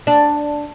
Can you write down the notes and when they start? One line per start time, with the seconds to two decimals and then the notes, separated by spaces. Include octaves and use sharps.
0.07 D4